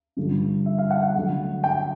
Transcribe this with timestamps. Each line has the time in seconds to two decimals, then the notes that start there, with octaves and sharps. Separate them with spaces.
0.17 G2 D3 F3
0.66 E5
0.78 F5
0.90 F#5
1.03 F#5
1.15 D3 F#3 A3
1.64 G5